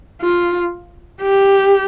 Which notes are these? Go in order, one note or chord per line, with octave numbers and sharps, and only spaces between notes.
F4
G4